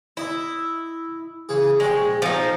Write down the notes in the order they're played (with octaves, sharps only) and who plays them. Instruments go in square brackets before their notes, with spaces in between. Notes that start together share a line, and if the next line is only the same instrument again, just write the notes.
[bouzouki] E4 [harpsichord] D#5 B5
[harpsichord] C#3 E3 G#4
[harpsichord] A#1 C#5 G5 [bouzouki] G#3
[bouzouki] F3 D#4 [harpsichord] A3